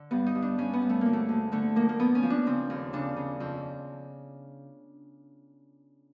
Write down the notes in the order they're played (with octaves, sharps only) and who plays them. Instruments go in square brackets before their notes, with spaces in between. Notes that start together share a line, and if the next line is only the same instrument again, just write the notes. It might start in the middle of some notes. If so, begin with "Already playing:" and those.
Already playing: [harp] D3
G2 B3
D#4
G2
D4
G2 C#4
B3
G2
A3
D2 A#3
A3
D2
D3 A3
F3 A#3
A#3
F3 B3
C#4
F3
D4
C#3 C4
D#2
C#3 D4
C#3
F2